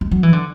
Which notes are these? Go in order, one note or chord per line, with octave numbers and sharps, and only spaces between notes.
G#3
F#3
E3
D3